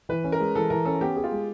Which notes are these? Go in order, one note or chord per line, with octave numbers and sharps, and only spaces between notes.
E3 B4
C#4
A#4
G#3
E3 A4
E3 A#4
C#4 A4
B3 G4
G#4
F4
G#3